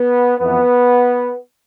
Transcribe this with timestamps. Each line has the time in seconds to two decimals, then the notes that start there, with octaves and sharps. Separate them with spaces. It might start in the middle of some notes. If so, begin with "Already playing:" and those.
Already playing: B3
0.39 F2 E3 B3